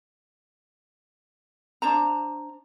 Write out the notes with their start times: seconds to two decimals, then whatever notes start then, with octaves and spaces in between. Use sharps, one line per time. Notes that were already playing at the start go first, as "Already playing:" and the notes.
1.82 D4 C5 A5 A#5